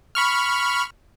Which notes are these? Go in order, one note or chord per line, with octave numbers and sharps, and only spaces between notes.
B5 C#6 F6